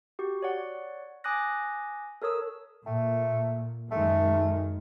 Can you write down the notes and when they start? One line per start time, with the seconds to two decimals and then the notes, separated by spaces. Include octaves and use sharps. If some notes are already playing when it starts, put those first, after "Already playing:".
0.19 F#4 G4
0.42 C#5 D5 F#5
1.24 G#5 D6 D#6 F#6 A#6
2.22 A4 A#4 C#5 D#6 E6
2.86 A#2 A3
3.91 F#2 D#3 G#3 A3